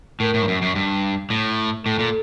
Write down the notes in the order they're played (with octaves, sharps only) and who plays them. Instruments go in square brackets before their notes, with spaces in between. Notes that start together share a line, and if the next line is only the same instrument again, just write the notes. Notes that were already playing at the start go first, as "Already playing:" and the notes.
[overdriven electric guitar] A2 [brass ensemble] A#4
[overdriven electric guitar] A2
G2
F#2
F#2
G2
A2
[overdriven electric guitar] A2 [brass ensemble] A4
[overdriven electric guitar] A#2